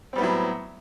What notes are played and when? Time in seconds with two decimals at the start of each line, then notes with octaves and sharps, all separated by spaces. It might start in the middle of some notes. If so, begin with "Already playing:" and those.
0.13 C4
0.15 G3
0.18 B3
0.21 A2
0.23 F#3